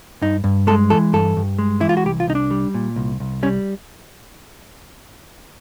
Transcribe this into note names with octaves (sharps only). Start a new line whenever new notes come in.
G2 D#4
G2
G#3 A4
E3 A4
G2 A4
G2
G#3
E3 E4
F4
F#4
C2 G4
F4
C2 D#4
D4
G3
A#2
C2
C2
G3 C#4